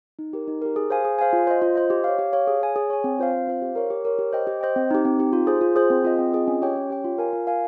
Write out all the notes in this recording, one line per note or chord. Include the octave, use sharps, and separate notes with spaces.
D#4
G4 A#4
D#4
G4 A#4
G#4
C5 F5 G#5
G#4
C5 F5 G#5
F4
C5 D#5
F4
C5 D#5
G4
C#5 F5
G4
C#5 F5
G#4
C#5 G#5
G#4
C#5 G#5
C4
F4 C5 F5
C4
F4 C5 F5
G4
A#4 C#5
G4
A#4 C#5
G4
C5 D#5 G5
G4
C5 D#5 G5
C4
D#4 G4
C4
D#4 G4
F4
G#4 C5
F4
G#4 C5
C4
F4 G#4 D#5
C4
F4 G#4 D#5
C#4
G4 C#5 G5
C#4
G4 C#5 G5
F4
A#4 F5 G#5
F4
A#4 F5 G#5